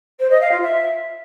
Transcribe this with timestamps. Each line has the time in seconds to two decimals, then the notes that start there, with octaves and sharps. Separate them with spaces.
0.20 C5
0.30 D#5
0.41 F5
0.51 F4
0.62 E5